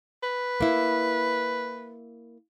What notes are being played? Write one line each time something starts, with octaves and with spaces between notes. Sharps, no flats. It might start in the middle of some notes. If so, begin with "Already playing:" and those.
B4
A#3 E4